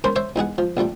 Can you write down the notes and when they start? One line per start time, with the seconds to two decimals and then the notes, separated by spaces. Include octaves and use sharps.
0.04 C#4 A#4 C5 B5 C6
0.16 C5 C#5 E5 C6
0.36 E2 D#4 G#4 F#5
0.58 F3
0.77 A#1 F2 G3 A3